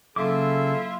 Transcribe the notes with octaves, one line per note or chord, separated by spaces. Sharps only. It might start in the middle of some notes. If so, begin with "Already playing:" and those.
C#3 F#3 A#3 E4 F4 A4 E5 D6